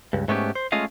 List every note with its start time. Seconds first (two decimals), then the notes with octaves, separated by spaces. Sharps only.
0.13 C#2 G2
0.28 G#2 A3 B3 C#4 F#4 G4
0.55 C5
0.72 G#3 A3 C#4 F4 D#5 F5